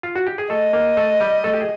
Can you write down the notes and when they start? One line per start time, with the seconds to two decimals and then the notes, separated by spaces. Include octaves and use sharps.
0.03 F4
0.16 F#4
0.27 G4
0.38 G#4
0.50 A3 A4 D#5
0.73 A#3 A#4
0.97 A3 A4
1.20 G3 G4
1.44 A3 A4
1.53 G4
1.61 G#4